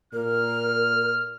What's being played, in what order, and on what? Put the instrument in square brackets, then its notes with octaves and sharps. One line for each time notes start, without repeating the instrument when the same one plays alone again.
[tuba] A#2 [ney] A#4 [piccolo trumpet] F6